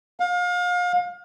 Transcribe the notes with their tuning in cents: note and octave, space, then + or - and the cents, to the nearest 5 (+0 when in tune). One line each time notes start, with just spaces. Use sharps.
F5 +35